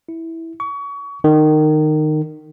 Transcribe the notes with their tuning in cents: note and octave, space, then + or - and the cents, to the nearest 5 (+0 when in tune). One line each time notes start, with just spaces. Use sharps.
E4 -10
C#6 +30
D#3 -20